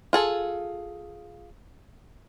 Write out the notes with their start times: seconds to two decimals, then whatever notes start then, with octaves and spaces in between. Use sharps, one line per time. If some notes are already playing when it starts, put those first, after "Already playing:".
0.13 F4 G#4 A4